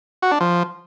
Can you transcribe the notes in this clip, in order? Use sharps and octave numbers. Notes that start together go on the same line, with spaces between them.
F#4
D4
F3